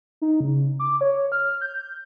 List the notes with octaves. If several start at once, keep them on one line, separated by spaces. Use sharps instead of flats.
D#4
C#3
D6
C#5
F6
G6